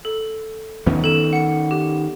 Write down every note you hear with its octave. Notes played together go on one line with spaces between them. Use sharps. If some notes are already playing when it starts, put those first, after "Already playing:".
A4
D#3 B3 C#4
A4 E7
F#5 C#7
G4